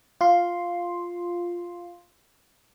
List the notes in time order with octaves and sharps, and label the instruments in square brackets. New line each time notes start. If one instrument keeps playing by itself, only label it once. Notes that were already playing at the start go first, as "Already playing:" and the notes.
[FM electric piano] F4 C6